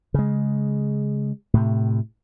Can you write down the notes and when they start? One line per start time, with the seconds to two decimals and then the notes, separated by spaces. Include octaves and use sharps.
0.14 C#3 G#3
1.54 A2 C3